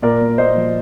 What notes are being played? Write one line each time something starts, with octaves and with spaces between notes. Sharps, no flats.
A#2 A#4 D5
A#2
A#2 C5 D#5
F3